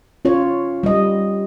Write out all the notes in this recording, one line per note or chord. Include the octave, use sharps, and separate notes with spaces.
C#4 F4 C#5
G3 D#5